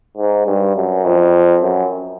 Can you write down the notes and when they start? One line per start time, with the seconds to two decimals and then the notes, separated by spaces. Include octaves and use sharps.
0.17 G#2
0.46 G2
0.76 F#2
1.05 F2
1.63 F#2